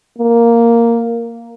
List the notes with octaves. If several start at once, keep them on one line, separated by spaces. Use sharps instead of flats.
A#3